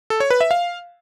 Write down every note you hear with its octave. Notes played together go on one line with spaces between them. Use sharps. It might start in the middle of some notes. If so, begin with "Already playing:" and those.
A4
C#5
B4
E5
F5